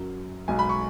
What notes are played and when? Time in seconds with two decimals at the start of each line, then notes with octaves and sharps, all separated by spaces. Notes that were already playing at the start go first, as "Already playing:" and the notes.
Already playing: F#2 F#3
0.48 B1 B2 G#3 G#5
0.59 B5
0.69 C#6